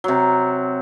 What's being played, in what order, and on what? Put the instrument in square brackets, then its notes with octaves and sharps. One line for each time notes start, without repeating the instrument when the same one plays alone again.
[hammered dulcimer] C3 F#3